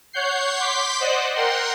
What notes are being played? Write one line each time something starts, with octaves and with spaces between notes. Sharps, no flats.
C#5 F#5 G6 C7
C6 D6 G6 B6
C5 D5 D#5 F#5
A#4 F#5 G5 C6